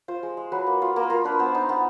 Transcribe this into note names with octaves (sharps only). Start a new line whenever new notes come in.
F4 C5
G#3
G#3
F#3 B4
A#3
F4
A#3 A#4
F4 A#4
D4 B4
B3 C5
D#4
B3